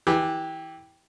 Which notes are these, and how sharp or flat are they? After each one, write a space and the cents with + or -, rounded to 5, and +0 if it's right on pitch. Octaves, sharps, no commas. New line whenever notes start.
E3 -20 G4 +0 G#5 +0